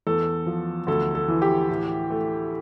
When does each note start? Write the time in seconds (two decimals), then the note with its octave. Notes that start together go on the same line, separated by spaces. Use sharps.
0.07 E2 A4
0.46 F3
0.87 D2 A4
1.15 A4
1.28 E3
1.42 G4
1.69 A2
2.10 A3